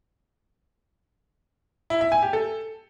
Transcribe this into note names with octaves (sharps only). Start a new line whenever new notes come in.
E4
E5
G#5
G4
A4